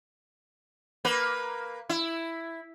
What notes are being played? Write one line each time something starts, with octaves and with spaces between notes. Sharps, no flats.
A#3 B4
E4